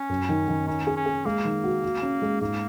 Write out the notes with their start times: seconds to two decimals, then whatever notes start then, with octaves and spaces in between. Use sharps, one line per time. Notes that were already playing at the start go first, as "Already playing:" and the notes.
Already playing: C#4
0.09 F#2
0.29 D#3
0.48 D#3
0.67 C#4 D#4
0.87 G#4
0.96 C#4
1.06 G#4
1.25 G#3 A#3
1.45 D#3
1.64 F#4
1.83 F#4
2.02 C#4
2.22 G#3
2.41 G#2 A#3